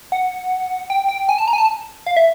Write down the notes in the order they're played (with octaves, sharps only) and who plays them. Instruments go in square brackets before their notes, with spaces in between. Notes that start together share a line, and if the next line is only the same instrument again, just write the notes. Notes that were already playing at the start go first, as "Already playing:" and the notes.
[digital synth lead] F#5
G5
G5
G#5
A5
A#5
G#5
A5
F5
E5